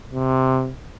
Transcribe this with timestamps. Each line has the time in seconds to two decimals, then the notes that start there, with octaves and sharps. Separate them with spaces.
0.11 C3